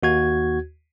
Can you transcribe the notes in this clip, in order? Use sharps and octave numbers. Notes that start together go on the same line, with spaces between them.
D#2 F#4 G#6